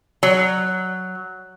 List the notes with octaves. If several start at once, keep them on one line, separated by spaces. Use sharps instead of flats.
F#3